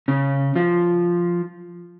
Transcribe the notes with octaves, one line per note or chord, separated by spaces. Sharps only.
C#3 C#4
F3 F4